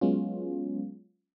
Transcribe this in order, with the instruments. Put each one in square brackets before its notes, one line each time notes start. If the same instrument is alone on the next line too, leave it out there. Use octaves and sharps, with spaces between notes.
[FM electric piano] F#3 G#3 B3 C#4 F4